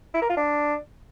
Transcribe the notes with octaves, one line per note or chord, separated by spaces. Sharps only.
E4
A#4
F4
D4